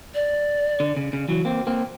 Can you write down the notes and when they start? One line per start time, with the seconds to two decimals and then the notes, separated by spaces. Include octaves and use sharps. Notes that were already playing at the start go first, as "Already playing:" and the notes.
0.15 D5
0.80 D3
0.97 C#3
1.13 C#3
1.29 E3 F#3
1.45 A#3 C4
1.67 A#3 C4